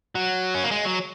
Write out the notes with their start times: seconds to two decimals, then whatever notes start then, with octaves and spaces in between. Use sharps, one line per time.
0.15 F#3
0.55 C#4
0.64 A#3
0.71 G#3
0.85 F#3